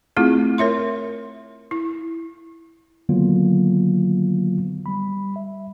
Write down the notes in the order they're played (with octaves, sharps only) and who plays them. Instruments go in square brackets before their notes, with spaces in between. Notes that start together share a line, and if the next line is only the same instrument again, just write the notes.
[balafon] A3 C4 E4 F4 G#4
A#4 C#5 E5 C6
E4
[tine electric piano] D3 D#3 F#3 A#3 B3 F4
G3 B5
E5